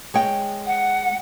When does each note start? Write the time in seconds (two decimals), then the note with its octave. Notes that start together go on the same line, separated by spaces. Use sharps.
0.14 G#3 C#5 G5
0.66 F#5